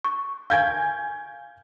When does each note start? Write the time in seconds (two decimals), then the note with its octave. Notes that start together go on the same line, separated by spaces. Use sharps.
0.04 C#6
0.50 F5 G#5 G6 G#6